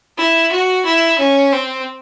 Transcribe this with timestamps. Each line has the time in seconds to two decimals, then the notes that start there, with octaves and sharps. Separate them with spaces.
0.18 E4
0.52 F#4
0.85 E4
1.19 C#4
1.52 C4